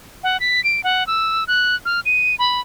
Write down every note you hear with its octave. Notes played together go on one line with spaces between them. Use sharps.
F#5
B6
D7
F#5
E6
F#6
F6
D#7
B5